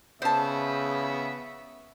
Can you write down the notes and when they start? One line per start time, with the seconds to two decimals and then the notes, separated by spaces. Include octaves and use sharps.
0.22 C#3 B3 C5 E5 A5